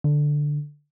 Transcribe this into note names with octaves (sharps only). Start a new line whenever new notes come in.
D3